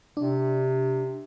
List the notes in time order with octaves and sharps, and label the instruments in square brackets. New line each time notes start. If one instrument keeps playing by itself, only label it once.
[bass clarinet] C3 [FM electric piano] D4